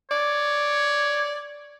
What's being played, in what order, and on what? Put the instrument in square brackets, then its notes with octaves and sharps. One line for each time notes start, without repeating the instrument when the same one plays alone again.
[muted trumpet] C#5 [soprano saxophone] D5